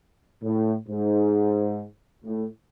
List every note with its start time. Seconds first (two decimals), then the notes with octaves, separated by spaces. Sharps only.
0.43 A2
0.88 G#2
2.24 A2